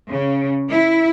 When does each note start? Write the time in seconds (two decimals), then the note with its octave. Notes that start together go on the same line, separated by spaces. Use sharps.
0.10 C#3
0.70 E4